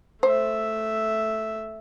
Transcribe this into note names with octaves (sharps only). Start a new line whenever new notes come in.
A3 C5 E5